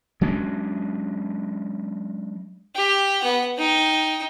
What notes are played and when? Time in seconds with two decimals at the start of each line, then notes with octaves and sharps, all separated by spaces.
0.21 F#3 G#3 C#4 D4
2.75 G4
3.20 B3 F#5
3.58 D#4 G5